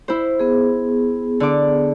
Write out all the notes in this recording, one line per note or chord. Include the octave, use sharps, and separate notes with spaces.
E4 C5
B3 G#4
D3 D6